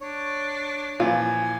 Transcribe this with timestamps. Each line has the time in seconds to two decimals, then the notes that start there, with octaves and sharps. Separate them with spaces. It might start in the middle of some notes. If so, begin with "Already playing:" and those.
0.01 D4 C#5
1.00 A#2 E3 F3 F4 G#5